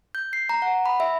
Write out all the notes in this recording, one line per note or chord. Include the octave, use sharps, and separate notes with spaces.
G6
C7
A#5
F#5
B5
E5